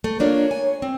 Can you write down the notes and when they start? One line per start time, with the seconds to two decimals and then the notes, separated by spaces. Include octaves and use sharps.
0.04 A3
0.20 A#3 D4 F4 C#5
0.51 G#5
0.82 C4